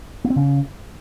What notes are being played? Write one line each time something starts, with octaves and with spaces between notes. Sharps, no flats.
A#3
C4
C#3